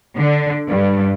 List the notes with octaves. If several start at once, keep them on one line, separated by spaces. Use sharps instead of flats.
D3
G2